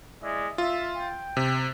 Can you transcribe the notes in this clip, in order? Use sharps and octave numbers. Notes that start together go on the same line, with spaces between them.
G#3 E4 D5
F4 E5
G5
C3